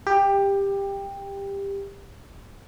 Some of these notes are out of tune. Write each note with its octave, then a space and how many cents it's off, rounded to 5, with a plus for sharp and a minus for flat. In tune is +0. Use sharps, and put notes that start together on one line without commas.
G4 +15